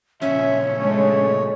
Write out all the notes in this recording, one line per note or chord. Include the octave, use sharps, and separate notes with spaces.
A#2 C#3 F3 C#4 E5
D3 G#3 A3 C#5